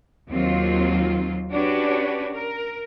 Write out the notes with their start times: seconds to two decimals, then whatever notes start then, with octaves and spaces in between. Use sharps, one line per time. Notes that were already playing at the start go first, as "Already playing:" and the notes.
0.32 D#2 D#3 F#3 C4 F4
1.51 C#4 D4 F#4 G4 B4 C#5
2.33 A#4